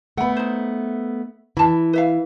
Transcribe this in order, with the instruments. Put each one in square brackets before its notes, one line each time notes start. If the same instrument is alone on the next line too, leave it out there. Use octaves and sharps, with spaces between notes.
[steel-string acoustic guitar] A3 B3 [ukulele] F#5 B5
[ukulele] D#4 C5
[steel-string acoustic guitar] E3 [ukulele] A5 B5
[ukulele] B4 E5 F5